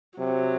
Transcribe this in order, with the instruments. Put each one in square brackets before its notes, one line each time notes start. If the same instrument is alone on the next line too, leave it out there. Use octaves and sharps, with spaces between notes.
[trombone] C3 [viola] F#3